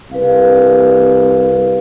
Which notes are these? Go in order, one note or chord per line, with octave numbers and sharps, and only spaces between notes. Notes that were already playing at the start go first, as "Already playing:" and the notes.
C2 B4 F5